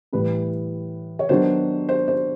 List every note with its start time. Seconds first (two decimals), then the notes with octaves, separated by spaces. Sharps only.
0.13 A2 E3 G3 B4
1.19 C#5
1.29 D#3 F#3 B3 D4 C5
1.89 C5
2.08 C5